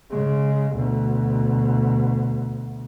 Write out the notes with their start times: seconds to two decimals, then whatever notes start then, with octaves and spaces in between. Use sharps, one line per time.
0.11 C#3 G#3
0.76 D2 B2